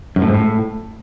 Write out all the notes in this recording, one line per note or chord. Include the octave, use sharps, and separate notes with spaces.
F#2
A2
G#2
A2